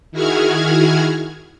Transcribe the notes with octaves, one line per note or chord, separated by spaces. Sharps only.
D#3 E4 F#4 G#4 F6 G#6